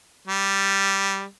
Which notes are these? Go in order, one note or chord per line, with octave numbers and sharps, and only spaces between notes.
G3